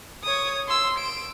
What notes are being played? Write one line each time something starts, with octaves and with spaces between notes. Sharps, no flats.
C#5 D#6
C6 E6
D7 E7